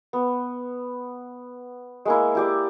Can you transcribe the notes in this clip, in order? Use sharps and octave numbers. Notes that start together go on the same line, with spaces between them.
B3
G#3 A#3 E4
E4 G4 D5